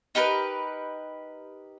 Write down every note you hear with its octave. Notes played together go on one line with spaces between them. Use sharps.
D#4 G4 A#4 B4